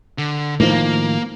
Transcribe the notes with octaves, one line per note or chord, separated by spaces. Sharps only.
D3
A2 D#3 F3 A#3